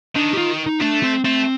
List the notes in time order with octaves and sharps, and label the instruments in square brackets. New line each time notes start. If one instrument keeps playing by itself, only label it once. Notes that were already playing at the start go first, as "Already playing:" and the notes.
[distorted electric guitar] D#3 [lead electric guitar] D4
[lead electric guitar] G4
F4
D#4
[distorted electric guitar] A3 [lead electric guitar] D4
[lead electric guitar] C4
[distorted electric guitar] A3 [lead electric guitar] C4